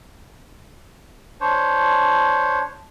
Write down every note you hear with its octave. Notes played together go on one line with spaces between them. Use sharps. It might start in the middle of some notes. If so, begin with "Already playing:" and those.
D4 C5 C#5